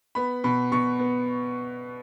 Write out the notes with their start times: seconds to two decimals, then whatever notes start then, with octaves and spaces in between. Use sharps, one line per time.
0.15 B3 B5
0.44 B2 B5
0.72 B2 C#6
0.99 B3